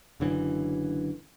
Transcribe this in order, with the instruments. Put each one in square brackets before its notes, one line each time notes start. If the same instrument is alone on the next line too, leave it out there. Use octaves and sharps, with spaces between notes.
[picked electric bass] F#1 F#2 D3 E3